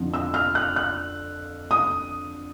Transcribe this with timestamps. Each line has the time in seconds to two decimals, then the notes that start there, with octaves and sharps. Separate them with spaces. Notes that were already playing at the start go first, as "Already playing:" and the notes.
Already playing: F2 D3 F3
0.14 E6
0.34 F6
0.55 F#6
0.76 F#6
1.71 D#6